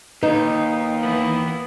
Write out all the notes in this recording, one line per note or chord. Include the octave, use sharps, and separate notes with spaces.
D#2 D#4 B4
E3 A#3 B3